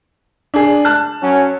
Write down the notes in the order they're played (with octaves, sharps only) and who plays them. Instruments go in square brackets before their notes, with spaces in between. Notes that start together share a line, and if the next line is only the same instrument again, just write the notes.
[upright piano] D4 G#4
A5 F#6
[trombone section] F#2 F#3 C#4